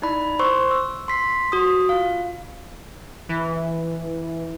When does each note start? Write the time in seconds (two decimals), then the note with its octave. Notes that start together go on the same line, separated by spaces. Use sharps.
0.02 D#4 E4 D5 B5
0.39 C5 C6 C#6 E6
0.71 E6
1.08 C6 B6 C7
1.52 F#4 D#6
1.89 F4 F5
3.29 E3